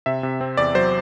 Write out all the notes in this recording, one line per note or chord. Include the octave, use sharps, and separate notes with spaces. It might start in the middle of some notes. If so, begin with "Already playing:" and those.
C3 E5
C3
C4
E2 D5
F#3 C5